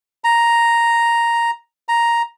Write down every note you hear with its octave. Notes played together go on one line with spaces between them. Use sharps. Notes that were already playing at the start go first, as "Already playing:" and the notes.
A#5
A#5